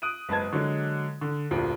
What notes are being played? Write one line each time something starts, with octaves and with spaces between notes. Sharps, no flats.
D#6 F#6 D7 D#7
F#1 G#3 B4 A5 G#6
D3 F#3 G#3
D3
F1 D2 A#2